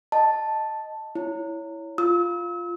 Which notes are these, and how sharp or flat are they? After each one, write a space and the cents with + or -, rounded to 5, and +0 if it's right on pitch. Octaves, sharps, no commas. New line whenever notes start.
D#5 +0 A5 +0
E4 +0 C#5 +10
F4 +0 E6 -40